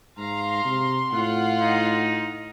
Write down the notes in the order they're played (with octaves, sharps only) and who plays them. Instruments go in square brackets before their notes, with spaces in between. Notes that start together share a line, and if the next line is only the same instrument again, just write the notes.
[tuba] G#2 [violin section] F5 A#5 [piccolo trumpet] C6
[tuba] C3
[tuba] A2 [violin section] F4 F#5
[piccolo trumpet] D#4